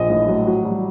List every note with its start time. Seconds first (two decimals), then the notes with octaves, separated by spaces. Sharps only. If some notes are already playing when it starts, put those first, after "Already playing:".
Already playing: A#1 D#5
0.10 A2
0.28 F#3
0.47 F#3
0.65 G3